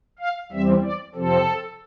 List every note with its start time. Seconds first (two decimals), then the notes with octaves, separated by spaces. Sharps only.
0.19 F5
0.52 E2 E3 G3 C4 E5
0.84 D5
1.15 F2 C3 F3 C4 A4